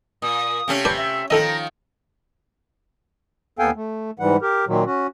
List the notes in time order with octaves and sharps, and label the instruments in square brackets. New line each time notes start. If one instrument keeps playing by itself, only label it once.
[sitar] A#2 [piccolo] D#6
[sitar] C3 A3 C#4
[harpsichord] D4 B4 D5 [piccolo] G6
[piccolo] E5
[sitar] D#3 F3 [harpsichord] D#4 A4 D#5 [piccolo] A#5
[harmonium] D#2 B3 A4 F5 G5 G#5
A3
G#2 E3 G3 F#5
G4 A#4
A#2 D#3 F#3
C#4 F#4